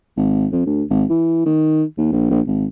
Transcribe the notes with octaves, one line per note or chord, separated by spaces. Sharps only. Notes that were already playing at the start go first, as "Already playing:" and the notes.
G#1
F2
D2
G#1
E3
D#3
D#2
A#1
A#1
G#1